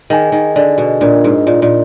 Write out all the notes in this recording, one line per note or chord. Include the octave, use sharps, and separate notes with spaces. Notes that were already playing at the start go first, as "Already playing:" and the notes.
D#3 G#4 D#5 G#5
D#3
D3 G#4 D#5 G#5
B2
A#2 D4 F4 A#4 D#5
G#2
A#2 D4 F4 A#4 D#5
A#2